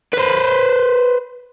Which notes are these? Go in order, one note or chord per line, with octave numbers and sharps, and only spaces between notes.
B4 C5